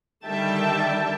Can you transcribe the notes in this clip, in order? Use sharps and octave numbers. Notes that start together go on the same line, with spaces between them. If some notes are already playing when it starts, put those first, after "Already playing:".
D3 D#3 G3 E5 G5 A5